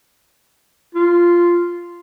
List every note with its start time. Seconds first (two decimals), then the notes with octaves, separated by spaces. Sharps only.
0.95 F4